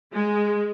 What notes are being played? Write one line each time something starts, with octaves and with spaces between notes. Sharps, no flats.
G#3